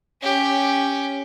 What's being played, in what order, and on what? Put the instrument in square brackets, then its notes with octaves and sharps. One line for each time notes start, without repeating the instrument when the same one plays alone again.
[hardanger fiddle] C#4 G4